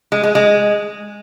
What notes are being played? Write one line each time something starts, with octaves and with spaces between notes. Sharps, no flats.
G#3
G#3
G#3